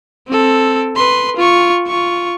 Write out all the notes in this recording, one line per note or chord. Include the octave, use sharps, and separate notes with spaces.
C4 A4
B4 C6
F4 C#6
F4 C#6